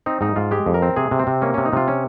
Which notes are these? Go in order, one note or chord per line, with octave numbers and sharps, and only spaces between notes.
C4 D#4
G#2 D#4
G#2 F4
G#3 G4
F2
A#4
C4
C3 G#4
C3
C4
C3
A#3 C#4
C3 C#4
D#4
C3 F4
C#4